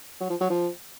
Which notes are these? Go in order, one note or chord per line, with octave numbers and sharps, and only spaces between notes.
F#3
F3
F#3
F3